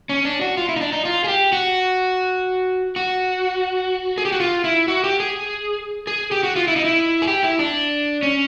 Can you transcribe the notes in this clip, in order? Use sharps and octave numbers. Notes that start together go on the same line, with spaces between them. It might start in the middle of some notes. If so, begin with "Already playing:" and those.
C#4
D4
F#4
F4
E4
D#4
D4
D#4
F4
G#4
G4
F#4
F#4
G#4
G4
F#4
F4
E4
F#4
G4
G#4
G#4
G4
F#4
F4
E4
D#4
E4
G#4
G4
E4
D4
C#4